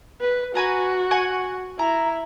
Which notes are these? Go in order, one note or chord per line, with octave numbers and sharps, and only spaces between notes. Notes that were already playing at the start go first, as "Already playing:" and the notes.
B4
F#4 B4 G#5 A#5
F#5 G#5 C#6
E4 A#5